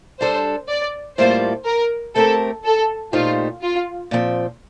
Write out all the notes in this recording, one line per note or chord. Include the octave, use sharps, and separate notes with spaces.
G3 D4 A4 C5
D5
A2 G3 A#3 F4 A4 C5
A#4
A3 C4 G4 A4 A#4
A4
A#2 A3 D#4 F4 G4 C5
F4
A#2 F3 C4